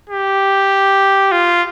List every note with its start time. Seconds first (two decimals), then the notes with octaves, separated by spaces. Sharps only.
0.10 G4
1.32 F4